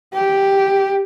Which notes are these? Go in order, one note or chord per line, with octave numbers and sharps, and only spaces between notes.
G4